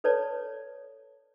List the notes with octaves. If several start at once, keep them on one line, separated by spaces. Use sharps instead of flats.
A4 B4 C#5 D5 A5